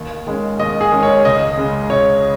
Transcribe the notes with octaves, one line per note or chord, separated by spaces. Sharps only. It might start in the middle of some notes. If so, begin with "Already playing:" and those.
Already playing: D#2
D#3 G#3 C#4
D#2 D#5
G#4
D#3 G#3 C#4
C#5
C#2 D#5
C#3 G#3
C#2 C#5